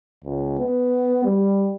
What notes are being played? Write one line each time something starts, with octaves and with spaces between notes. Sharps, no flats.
C#2
B3
G3